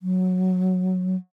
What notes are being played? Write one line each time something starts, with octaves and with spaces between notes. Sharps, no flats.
F#3